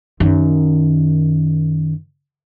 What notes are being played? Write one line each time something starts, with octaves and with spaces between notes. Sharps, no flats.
F#2 D#3